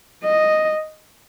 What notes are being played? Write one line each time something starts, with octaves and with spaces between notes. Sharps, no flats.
D#5